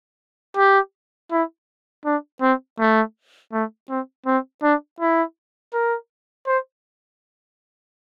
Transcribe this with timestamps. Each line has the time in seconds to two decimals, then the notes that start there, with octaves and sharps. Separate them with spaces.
0.57 G4
1.32 E4
2.05 D4
2.41 C4
2.79 A3
3.53 A3
3.89 C4
4.26 C4
4.63 D4
5.01 E4
5.73 A#4
6.47 C5